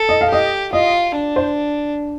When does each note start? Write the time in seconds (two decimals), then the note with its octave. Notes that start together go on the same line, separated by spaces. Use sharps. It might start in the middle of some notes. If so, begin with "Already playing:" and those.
Already playing: A4
0.09 D#5
0.21 F5
0.30 G4 D#5
0.73 F4 D#5
1.15 D4
1.36 C5